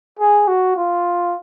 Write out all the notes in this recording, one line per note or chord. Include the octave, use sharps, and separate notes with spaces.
G#4
F#4
F4